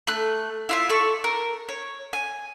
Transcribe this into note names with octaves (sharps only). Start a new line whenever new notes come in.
A3 F#6
E4 F4 E5
A4 D5 C#6
A#4
C#5
G#5